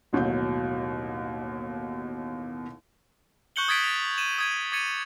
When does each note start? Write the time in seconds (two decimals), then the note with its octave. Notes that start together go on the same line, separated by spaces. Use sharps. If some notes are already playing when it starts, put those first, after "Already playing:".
0.13 A1 D#2 B2 F#3 G6
3.56 C#6 F#6 G6 C#7 F#7 G7
3.68 D#6 G#6 A6 B6 D7
3.83 A6 F7
4.17 D#7 E7 F#7
4.38 D#6 G#6 D#7
4.72 D6 G#6 A6 C#7 D#7 F7